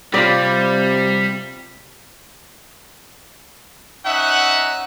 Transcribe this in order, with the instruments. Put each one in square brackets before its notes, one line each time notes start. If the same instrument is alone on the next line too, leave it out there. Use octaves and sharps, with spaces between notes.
[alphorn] C3 [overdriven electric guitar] G3 [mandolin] C4 B5 [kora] F4 D5
[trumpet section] C#4 D#4 E5 F#5